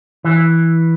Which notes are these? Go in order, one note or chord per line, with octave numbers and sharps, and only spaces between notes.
E3